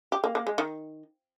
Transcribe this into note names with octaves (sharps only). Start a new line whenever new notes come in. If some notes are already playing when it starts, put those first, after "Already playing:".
G4
A#3
A#3
G#3
D#3